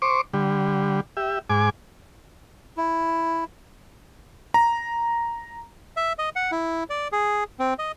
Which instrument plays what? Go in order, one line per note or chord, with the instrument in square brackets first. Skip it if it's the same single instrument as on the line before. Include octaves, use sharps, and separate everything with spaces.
[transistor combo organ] C5 C#6 D6
D3 G3
G4 E5
G#2 G#5 D6
[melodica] E4
[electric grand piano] A#5
[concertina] E5
D#5
F#5
E4
D5
G#4
C4
D#5